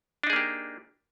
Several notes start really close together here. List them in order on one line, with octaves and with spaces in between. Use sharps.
D4 D#4 G#4 A#3 G4